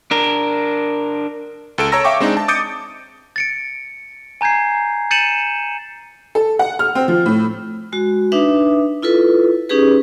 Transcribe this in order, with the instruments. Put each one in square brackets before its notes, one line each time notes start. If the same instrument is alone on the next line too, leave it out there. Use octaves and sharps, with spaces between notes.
[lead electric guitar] D4 A#4
[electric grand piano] C#2 A4 D7
C#5 A5 A#5 E6 A#6
E5 F5 G5 C#6 D6
G#3 C4 D4 D#4
A5
D6 D#6 G6 A6 C#7 D7
[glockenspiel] A6 C#7 D7
G#5 A#5 G6 G#6 C7
G6 A6 C#7 D#7 E7 F#7
[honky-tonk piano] A4
F#5
F6
C4
F3
A2
[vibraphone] G#3 F#4
D4 D#4 B4 E5
E4 F4 A4 B4
C#4 D#4 G4 G#4 B4